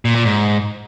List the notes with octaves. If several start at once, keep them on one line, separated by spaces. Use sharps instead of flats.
A#2
A#2
G#2